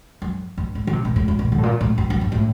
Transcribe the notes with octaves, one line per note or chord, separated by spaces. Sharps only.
F#2
G2
A2
D3
C3
A#2
A2
G2
A#2
D3
A2
A#2
A2
G2
F#2
G2
A2